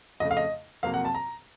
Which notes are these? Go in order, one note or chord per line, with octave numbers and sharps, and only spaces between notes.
F2 C#3 A3 D#5
F5
D#5
F2 C3 F#3 A#3 F5
F#5
A5
A#5